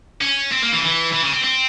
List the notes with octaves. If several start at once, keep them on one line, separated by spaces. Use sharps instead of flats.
C#4
C4
A#3
E3
C#3
E3
E3
C#3
C4
C4